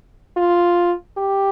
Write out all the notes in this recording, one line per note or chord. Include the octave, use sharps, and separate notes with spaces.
F4
G4